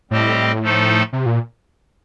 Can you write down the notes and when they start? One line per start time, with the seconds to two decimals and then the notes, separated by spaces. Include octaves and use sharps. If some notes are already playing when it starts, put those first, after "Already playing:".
0.11 A2 G3 C4 G4 C5 D#5
0.62 F3 A3 D#4 A4 C5
1.13 C3
1.26 A#2